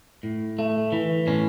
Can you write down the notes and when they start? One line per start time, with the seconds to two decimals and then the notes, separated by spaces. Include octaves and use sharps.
0.23 A2
0.59 A3
0.92 E3
1.27 A2 C#4